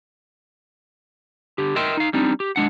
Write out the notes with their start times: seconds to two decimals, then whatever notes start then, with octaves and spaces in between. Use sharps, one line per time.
1.58 D3 G4
1.76 A#4 D#5 E5 G5 C6
1.97 D#4 F5
2.13 G3 C4 D4 D#4
2.40 G4
2.56 G#3 D4 F#5